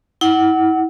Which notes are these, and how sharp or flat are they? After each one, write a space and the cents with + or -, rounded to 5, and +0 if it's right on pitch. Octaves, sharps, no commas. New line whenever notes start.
E4 -35 F#5 +15